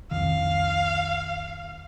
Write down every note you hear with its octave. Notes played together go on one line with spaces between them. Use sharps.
C2 F2 D#3 F5